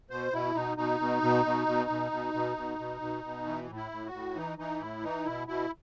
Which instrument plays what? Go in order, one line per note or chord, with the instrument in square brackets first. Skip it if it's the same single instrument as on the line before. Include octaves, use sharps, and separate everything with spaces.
[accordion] B2 C5
B2 E4
B2 D#4
B2 D#4
B2
B2
B2
B2
B2
B2
B2
B2
B2
B2
B2
E3
A2
E4
A2
F#4
A2
E3 D#4
E3 D#4
A2 E4
E3 D#4
B2 E4
B2 E4